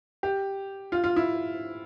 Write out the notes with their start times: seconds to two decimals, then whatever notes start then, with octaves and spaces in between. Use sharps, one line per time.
0.23 G4
0.92 F4
1.04 F4
1.16 E4